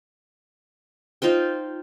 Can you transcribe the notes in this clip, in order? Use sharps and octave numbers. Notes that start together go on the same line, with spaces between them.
D#4 F4 C5 G5